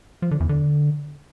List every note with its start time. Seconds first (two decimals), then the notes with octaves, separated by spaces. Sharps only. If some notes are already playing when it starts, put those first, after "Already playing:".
0.22 F3
0.31 D3
0.40 E2
0.49 D3